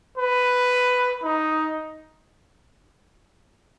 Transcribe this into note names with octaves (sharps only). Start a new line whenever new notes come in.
B4
D#4